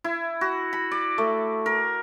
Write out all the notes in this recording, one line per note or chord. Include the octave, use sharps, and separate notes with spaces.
E4
F#4
B5
D5
A3
A#4